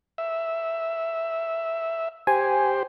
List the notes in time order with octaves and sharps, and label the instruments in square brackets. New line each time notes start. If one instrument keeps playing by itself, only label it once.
[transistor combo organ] E5
[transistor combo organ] G4 C5 [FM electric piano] G#5